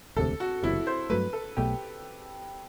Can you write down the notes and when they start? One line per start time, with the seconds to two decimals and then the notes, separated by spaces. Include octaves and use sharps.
0.17 E1 D2 C3 A4
0.40 F#4
0.63 F#1 E2 C3 E4
0.87 C5
1.10 G2 F#3 A3 B4
1.33 A4
1.57 B1 B2 A3 G4